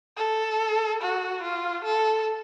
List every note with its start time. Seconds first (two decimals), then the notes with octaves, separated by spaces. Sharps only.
0.17 A4
1.01 F#4
1.42 F4
1.84 A4